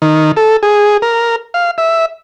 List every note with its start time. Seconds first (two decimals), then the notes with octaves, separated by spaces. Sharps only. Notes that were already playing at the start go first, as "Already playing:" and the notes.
0.02 D#3
0.37 A4
0.63 G#4
1.02 A#4
1.54 F5
1.78 E5